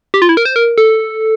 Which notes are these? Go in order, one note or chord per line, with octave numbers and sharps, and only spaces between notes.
G4
F4
E4
A#4
C5
A#4
A4